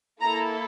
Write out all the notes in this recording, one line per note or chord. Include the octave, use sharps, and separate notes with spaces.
A#3 E4 A4 A#5